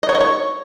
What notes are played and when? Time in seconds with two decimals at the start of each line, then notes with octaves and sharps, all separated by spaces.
0.03 D#5
0.09 C#5
0.15 D#5
0.20 C#5